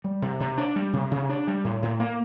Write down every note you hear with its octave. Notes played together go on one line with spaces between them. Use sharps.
G3
C3
C3
D4
G3
C3
C3
D4
G3
A2
A2
A#3